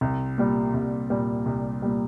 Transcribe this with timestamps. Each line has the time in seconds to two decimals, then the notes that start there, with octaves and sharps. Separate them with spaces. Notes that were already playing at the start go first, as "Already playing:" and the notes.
0.01 C2
0.38 A#2 G3
0.74 C2
1.10 A#2 G3
1.46 C2
1.82 A#2 G3